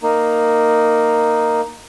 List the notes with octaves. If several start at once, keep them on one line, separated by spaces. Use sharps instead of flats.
A#3 D#4